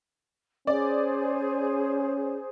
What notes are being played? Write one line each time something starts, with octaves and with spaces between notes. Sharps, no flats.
C#4 G#4 C5 D5